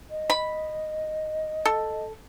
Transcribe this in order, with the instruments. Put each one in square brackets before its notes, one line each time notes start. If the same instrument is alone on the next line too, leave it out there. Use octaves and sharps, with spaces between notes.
[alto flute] D#5
[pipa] B5
A4